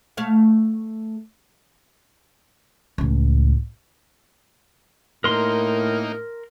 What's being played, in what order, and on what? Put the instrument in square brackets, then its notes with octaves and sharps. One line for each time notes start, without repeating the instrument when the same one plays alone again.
[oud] A3 C#5 F5
[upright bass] C#2 A2
[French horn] A2 [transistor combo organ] A#3 D#4 [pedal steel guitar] A#4 C6